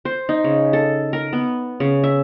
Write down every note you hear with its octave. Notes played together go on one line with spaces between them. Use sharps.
C5
D#4
C#3
A4
A#4
B3
C#3
E5